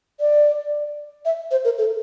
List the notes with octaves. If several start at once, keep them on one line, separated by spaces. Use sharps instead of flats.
D5
E5
C5
A#4
A4